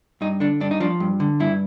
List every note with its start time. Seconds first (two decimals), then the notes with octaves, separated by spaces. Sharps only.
0.21 G2 D#4
0.40 D3 D4
0.60 G2 D4
0.71 D#4
0.80 F3 D4
1.00 G2
1.20 D3
1.40 G2 E4